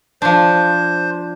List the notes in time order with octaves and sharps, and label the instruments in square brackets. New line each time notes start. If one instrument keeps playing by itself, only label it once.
[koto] F3 D4 [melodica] C5